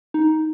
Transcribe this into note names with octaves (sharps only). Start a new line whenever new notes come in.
D#4